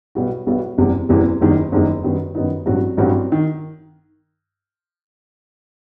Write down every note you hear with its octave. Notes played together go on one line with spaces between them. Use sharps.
B1 B2 G3 B3 F#4
B1 B2 G3 B3 F#4
F#1 E2 C3 E3 G3
F#1 E2 C3 E3 G3
F#1 E2 D#3 G3 D#4
F#1 E2 D#3 G3 D#4
F#2 D#3 G3 B3 D#4
F#2 D#3 G3 B3 D#4
A1 G2 F#3 C4 F#4
A1 G2 F#3 C4 F#4
D#3